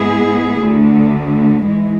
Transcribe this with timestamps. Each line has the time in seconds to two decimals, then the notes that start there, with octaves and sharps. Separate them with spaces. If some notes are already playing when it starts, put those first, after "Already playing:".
Already playing: G#2 G#3 B3 E4 G#4
0.58 D2 D3 A3
1.65 G#2 E3 G#3